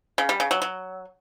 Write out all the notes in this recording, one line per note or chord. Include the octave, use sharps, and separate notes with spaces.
C#3
G3
C#3
F#3
F#3